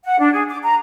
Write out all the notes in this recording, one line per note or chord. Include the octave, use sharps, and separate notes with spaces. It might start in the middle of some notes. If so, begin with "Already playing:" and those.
F#5
D4
G#4
D6
A#5